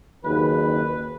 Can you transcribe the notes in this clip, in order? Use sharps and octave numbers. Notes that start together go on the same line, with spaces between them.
F#1 D#2 B4